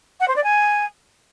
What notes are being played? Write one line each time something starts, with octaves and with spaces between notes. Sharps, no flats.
F#5
C5
D5
G#5